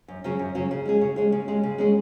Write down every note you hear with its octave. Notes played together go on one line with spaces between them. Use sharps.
F#2
C#3 F#3 C#4
F#2
C#3 F#3 C#4
C#3
G#3 C#4 G#4
C#3
G#3 C#4 G#4
C#3
G#3 C#4 G#4
C#3
G#3 C#4 G#4